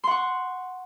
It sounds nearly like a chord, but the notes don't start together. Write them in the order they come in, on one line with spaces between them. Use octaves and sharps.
C6 F#5 C#6